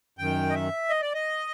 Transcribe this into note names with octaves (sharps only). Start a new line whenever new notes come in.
F#2 D#3 G5
D#5
E5
D#5
D5
D#5